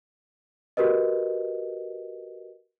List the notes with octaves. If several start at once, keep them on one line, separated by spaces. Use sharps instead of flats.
F#4 G4 A#4 B4 D#5